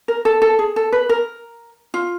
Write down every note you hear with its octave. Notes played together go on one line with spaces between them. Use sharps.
A#4
A4
A4
G#4
A4
B4
A#4
F4